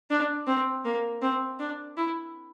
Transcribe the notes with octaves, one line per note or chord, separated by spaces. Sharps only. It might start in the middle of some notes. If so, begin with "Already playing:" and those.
D4
C4
A#3
C4
D4
E4